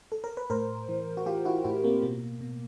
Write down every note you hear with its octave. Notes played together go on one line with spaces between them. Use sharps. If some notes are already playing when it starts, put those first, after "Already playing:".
A4
A#4
B4
A2 A#4 C5
E3
F#4
E3 F4 G4
E4 F#4
A2 E4 F#4
A#3 C4
B2 A#3
B2